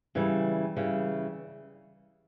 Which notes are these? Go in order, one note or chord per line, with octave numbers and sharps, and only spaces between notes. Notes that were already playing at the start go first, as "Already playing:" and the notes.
C#3 E3 G3
C#3 E3 G3